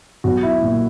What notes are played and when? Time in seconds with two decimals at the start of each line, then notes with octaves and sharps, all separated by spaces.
0.24 B1 F#4
0.43 E4
0.62 A#2